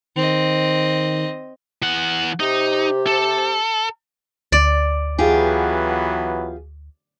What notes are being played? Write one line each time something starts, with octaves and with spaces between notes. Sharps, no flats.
D#3 C4 D#5
E3 F#5
C3 D#4 G4
A4
D2 D5
E3 F#3 B3 F4 G4 G#4